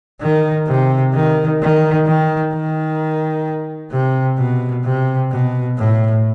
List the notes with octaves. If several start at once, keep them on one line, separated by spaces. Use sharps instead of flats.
D#3
C3
D#3
D#3
D#3
D#3
C3
B2
C3
B2
A2